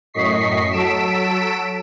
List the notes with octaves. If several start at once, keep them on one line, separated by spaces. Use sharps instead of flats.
F#2 A2 D#5 C#6 B6 C7
F#3 A4 B6 D7 E7